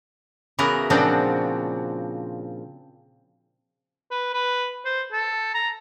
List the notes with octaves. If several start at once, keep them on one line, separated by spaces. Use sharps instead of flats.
C#3 E3 B3 E4 F#4 A#4
A#2 C#3 F3 C4 D4 F#4
B4
B4
C5
A4
A#5